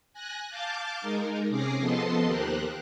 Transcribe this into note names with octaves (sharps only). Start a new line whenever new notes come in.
G#5 F#6 A#6
F5 A5 D6 G6 A6
G#3 D#4 A#4
C3 C#4 G#4 D6 A#6 C7
F3 B3 A4 D#5 A5 C6
D#2 G4 A#4 C5 F#6